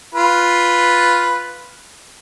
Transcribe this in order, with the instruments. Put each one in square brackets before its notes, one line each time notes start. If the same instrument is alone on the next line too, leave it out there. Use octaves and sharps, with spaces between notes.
[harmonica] F4 B4